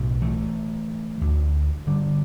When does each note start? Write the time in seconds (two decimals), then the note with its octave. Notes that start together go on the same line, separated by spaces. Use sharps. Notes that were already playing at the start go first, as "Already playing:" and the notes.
Already playing: B1 A2
0.22 E3 A3
1.21 D2 D3
1.87 D3 G3